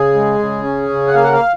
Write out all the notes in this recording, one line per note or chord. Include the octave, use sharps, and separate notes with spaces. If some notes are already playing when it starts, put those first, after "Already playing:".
Already playing: C#3 G#4
G#3
C#3
C#4
C#3
F#5
A#3 F5
F#5
F5